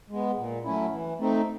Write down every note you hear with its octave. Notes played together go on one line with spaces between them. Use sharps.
G#3 B3
A#2
F#3 A3 C#4 E4
E3
A3 C4 D#4